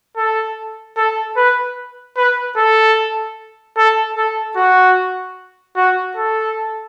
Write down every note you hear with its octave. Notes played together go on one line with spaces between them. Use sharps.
A4
A4
B4
B4
A4
A4
A4
F#4
F#4
A4